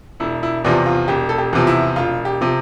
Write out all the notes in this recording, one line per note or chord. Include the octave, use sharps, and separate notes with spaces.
E1 E4
E4
E2 C3 F3 D4
F4
E1 G4
A4
G4
E2 C3 F3
E4
E1 F4
G4
C3 F3